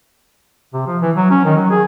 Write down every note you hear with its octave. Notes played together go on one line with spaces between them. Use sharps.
C3
F3
E3
F#3
C#4
D#3
F#3
G#4